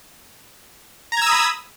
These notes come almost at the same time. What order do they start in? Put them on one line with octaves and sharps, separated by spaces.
A#5 G#6 E6 D#6 B5